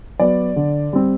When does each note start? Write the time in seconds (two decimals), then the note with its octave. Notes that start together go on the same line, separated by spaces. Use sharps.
0.20 F#3 B3 D5
0.56 D3
0.93 G3 C4